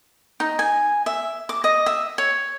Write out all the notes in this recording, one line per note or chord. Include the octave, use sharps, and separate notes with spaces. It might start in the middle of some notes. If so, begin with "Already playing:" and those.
D#4
G#5
E5
D6
D#5
E5
C#5